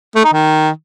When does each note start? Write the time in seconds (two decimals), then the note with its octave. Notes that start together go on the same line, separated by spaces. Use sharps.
0.15 A3
0.24 D#4
0.33 D#3